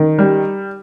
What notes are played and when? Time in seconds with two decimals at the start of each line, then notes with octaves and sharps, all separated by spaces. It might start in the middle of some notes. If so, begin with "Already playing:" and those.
Already playing: D#3
0.19 G3